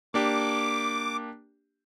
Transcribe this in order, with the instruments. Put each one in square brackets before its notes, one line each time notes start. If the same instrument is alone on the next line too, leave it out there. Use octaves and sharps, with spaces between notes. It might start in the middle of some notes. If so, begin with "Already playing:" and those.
[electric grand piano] A#3 D4 G4 [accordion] D6